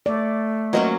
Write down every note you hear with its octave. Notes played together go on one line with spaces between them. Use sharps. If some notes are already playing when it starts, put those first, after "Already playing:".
A3 D5
F#3 A#3 B3 C#4 C5 D#5